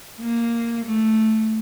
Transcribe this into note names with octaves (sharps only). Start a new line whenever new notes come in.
A#3
A3